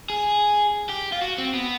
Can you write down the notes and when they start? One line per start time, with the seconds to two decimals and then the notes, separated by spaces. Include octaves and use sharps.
0.10 G#4
0.90 G4
1.13 F4
1.22 F#4
1.38 C4
1.54 B3